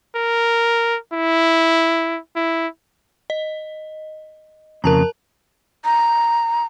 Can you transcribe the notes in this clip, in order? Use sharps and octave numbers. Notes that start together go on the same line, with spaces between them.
A#4
E4
E4
D#5
F2 C#3 A#4 A5 A#5
A#5